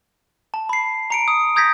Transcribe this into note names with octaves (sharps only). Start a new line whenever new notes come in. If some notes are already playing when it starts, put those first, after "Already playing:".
A5
B5 C7
A#5 C#7 D7
D#6
A#5 D#6 G6 G#6 A#6 B6